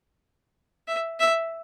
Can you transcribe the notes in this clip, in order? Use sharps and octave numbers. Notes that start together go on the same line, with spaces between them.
E5
E5